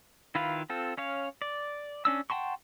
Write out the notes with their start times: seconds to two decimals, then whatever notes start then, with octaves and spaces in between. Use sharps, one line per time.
0.35 D#3 E4 F4 B4 F5
0.70 C4 F4 A4
0.97 C#4 C#5 F5
1.42 D5
2.05 C#4 D4 E6
2.30 F#5 G5 A5 C6 C#6